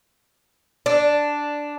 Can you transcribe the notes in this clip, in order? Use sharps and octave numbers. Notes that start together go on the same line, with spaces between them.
D4